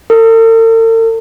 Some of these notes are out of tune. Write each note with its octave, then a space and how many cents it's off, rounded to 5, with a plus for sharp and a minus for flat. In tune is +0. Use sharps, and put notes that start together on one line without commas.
A4 +45